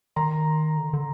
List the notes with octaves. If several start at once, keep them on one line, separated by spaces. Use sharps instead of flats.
D#3 A#5 C6
D3
D3